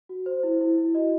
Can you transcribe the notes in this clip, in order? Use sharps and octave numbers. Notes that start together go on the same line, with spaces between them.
F#4
C5
E4
E4
E4
F#4 D#5